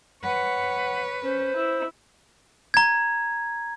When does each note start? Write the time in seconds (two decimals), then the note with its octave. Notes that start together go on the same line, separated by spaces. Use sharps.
0.24 B4 C#5 F#5
1.24 C#4 C5
1.56 E4
2.74 A#5 G#6